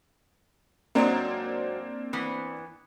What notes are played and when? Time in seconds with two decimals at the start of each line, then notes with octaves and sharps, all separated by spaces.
0.95 G#2 F#3 A#3 C4 D4 A#5
2.13 E3 B3